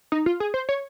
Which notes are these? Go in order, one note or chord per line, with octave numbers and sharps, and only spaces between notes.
D#4
F4
G#4
C5
C#5